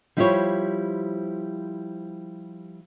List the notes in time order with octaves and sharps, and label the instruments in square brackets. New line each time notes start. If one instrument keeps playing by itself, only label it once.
[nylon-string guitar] F3 G3 E4 G4 C5 C#5